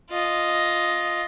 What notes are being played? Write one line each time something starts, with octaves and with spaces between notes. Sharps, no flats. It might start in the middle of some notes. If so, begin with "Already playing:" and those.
F4 D#5